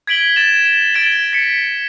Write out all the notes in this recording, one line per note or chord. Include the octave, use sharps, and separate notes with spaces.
G#6 B6 D7 F#7 G7
G#6 A6 E7
E7
G#6 A6 D7 E7 G7
B6 C#7